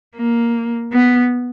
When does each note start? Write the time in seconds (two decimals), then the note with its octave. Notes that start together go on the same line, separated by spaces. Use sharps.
0.16 A#3
0.93 B3